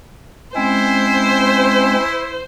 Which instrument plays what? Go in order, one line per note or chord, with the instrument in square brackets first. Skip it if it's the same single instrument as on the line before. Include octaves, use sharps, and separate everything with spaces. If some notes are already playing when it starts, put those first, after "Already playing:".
[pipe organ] G#3 C4 C#4 [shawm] E4 [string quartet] C5